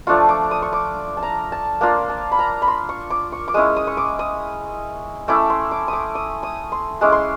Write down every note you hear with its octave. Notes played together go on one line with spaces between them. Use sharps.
F3 A3 D4 F4 C#6
D6
D#6
C#6
D6
A5
A#5
A5
A#3 D4 F4
A5
B5
A#5
B5
C6
C#6
D6
C#6
D6
G#3 C#4 E4 D#6
D#6
C#6
D6
D#6
A3 C#4 E4 D6
C6
D6
D6 D#6
D#6
D#6
C6
G#3 C#4 E4 D6
C6